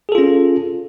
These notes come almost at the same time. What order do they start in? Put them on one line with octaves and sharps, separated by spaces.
G#4 A4 F4 C#4